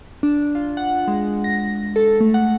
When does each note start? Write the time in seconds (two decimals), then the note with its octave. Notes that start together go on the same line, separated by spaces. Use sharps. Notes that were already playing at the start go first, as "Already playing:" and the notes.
0.23 D4
0.55 F4
0.77 F#5
1.08 G#3
1.44 A#6
1.96 A4
2.21 A3
2.34 F#5